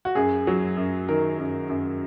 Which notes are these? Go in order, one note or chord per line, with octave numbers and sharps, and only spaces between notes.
F#4
F#2 G#4
F#3
F#2
D#3 A#4
F#2
F#2